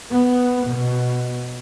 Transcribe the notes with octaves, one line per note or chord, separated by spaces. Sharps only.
B3
B2